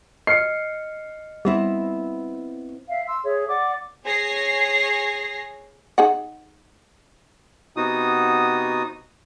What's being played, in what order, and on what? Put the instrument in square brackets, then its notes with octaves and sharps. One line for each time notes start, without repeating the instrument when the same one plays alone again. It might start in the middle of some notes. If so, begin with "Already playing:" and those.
[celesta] D#5 F6 C#7 [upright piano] C7
[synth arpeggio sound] G3 [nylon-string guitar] B3 C4 E4
[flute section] E5 F5
C6 E6
G#4 C#5 E5
D5 F#5 D6
[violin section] G#4 C#5 A#6 C7
[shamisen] D#4 G#4 F#5
[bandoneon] C3 B3 D#4 F#4 D#6